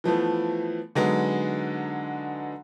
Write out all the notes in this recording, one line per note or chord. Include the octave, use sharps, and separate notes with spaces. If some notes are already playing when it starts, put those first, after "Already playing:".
E3 F3 A3 B3
D3 F#3 G#3 B3 D#4